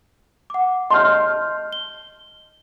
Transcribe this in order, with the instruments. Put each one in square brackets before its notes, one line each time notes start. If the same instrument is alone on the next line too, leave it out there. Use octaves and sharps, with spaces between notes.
[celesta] F#5 D6
[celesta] D#5 A5 G6 [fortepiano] C6 F6
[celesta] G7